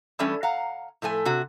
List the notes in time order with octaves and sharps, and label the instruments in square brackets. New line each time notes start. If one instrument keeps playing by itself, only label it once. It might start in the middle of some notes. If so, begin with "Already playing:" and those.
[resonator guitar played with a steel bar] E3 G3 A3 C#4
F5 F#5 A#5
A2 F3 A3 G#5
C3 F#4